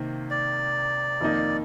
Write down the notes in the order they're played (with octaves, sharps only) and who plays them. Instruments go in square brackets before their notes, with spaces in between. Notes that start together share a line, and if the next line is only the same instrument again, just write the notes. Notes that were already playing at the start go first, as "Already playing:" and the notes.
Already playing: [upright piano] C3 D#3 A#3
[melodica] D5
[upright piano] F2 D#3 A#3 D#4